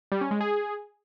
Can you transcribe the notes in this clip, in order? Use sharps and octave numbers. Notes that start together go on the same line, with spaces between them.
G3
C#4
G#3
G#4